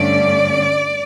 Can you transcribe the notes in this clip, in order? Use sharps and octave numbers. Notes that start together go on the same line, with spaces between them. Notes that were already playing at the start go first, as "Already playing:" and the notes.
Already playing: G2 D3 A3 C#4 D5